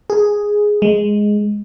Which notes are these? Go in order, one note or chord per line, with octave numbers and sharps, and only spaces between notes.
G#4
G#3